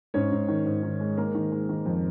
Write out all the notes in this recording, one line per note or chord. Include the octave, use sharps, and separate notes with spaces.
G#2 C#4 C#5
G#2
D#3
G#2
D#3
G#3
G#3 A#3 A#4
D#3
G#3
D#3
F2